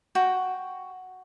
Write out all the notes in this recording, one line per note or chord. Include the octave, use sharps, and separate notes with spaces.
F#4 G5